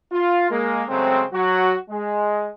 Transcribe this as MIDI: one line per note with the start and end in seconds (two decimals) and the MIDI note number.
0.12 0.47 65
0.50 0.83 56
0.50 0.83 58
0.89 1.22 49
0.89 1.22 54
0.89 1.22 56
0.89 1.22 57
0.89 1.22 60
1.33 1.74 54
1.33 1.74 66
1.89 2.49 56